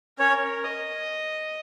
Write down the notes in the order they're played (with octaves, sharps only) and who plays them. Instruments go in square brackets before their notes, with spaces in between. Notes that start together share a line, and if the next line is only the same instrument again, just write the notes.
[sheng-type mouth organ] C#4 C#5 [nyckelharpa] A#4
[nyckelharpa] D#5